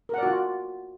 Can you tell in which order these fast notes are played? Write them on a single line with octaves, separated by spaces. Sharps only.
A#4 F#5 D5 F#4 F4